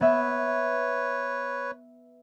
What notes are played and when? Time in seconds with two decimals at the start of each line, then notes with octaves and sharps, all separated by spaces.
0.01 B3 B4 C#5 E5